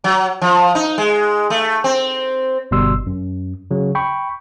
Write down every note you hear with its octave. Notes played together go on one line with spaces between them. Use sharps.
F#3
F3
D#4
G#3
A3
C4
G1 B2 G3 C6 E6
F#2
C#3 F#3
G5 B5 C#6